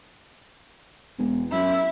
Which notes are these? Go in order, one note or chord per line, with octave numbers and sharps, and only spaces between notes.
E1
F#2 E4